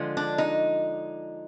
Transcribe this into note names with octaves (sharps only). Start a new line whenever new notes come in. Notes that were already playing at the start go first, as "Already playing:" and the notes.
Already playing: D3 F3 G#3
D4
D#4